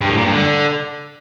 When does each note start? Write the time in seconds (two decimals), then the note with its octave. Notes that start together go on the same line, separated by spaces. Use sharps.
0.01 G2
0.09 A2
0.17 A#2
0.25 G2
0.33 D3